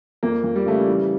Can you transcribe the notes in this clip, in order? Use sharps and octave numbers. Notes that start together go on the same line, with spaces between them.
F2 A#3
F2
G3
C#3 A3
G3
E3